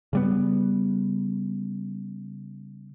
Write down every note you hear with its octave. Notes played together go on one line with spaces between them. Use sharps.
C#3 G3 B3